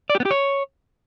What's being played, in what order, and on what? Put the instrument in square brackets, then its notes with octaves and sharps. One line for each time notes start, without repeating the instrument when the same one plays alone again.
[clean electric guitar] D5
G4
B3
G4
C#5